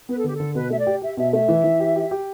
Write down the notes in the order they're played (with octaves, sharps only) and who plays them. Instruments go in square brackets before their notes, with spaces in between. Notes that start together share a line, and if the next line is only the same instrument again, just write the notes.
[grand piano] B3 [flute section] B4
[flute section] A4
[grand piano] D3 [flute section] G4
[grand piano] D3 [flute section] A4
[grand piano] B2 [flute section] B4
[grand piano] A3 [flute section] E5
[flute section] D5
[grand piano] G4
[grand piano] G4 [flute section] E5
[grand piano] B2 [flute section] E5
[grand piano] A3 [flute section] E5
[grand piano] E3
E3
G4
G4
G4